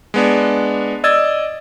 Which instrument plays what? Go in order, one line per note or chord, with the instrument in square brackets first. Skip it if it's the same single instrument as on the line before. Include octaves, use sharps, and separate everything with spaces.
[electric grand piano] G#3 B3 D4
D5 D#5 E6 G#6 A6